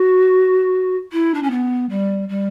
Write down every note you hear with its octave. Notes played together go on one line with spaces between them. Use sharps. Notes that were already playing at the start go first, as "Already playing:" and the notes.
Already playing: F#4
E4
D4
C#4
B3
G3
G3